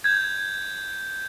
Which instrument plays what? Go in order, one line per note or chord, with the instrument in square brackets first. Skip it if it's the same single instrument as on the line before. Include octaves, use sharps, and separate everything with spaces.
[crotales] G6 G#6